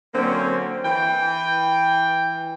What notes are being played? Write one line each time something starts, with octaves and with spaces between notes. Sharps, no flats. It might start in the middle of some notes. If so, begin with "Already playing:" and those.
D3 F#3 A#3 C4 C#4
E3 G5